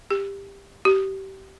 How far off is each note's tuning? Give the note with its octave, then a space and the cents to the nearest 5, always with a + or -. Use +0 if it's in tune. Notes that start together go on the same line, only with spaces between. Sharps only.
G4 +15
G4 -25